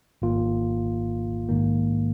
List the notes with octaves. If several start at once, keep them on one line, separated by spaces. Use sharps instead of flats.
G#1 G#2 D#3 A#3 F4
A#1 G#2 D#3 A#3